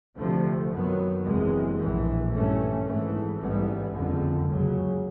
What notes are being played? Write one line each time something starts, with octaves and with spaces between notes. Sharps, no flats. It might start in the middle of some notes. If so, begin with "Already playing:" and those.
D2 C3 F3 A3
F#2 D#3 F#3 B3
F#1 E2 C3 E3 G#3
A#1 A2 E3
G2 E3 A3 C#4
G#1 G#2 E3 A3
A1 G#2 E3 G3 B3
F#1 F2 D3
C#2 C#3 F#3